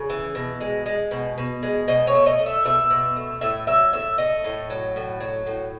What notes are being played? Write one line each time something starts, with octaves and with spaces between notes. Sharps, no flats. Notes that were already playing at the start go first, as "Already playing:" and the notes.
Already playing: C#3
E3
B2
G#3
G#3
B2
B2
G#3
B2 D#5
C#5
A3
D#5
A3
E5
B2 E5
B2
A3
A2 E5
F#3 E5
A2 E5
A3 D#5
A2
F#3
A2
F#3
A2